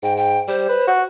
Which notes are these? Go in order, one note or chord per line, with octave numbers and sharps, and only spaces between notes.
G#2 G5
G5
G3 C5
B4
F#4